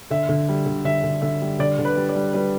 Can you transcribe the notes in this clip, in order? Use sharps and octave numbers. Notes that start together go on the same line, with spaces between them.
D3 E5
D3
G3
D3
D3 E5
D3
D3 E5
G3
D3 D5
D3
B4
G3
D5
G3
G3 B4